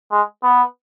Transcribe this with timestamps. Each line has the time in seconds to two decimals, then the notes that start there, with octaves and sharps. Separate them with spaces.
0.12 G#3
0.44 B3